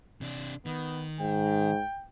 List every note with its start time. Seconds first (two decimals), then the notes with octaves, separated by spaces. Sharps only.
0.21 C3 D4
0.66 D#3 B3
1.20 G#2 G5